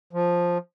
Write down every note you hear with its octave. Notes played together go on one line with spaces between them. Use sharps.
F3